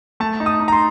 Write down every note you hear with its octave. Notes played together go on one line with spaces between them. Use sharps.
A3 A5
D#4
D#6
D#4
A#5
C6